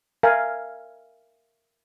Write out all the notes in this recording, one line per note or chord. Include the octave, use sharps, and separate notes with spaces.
A#4 E5 F5 G#5